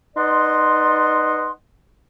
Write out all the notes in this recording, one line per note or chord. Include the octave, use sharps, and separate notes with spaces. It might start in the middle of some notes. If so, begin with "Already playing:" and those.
D#4 B4 D5 D#5 F#5 C6